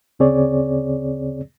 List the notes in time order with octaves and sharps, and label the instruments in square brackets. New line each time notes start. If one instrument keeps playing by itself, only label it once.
[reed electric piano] D2 C#3 C4 G#4 C#5 D5